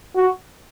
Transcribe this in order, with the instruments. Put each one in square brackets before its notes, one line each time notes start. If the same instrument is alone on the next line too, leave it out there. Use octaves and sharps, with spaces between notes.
[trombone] F#4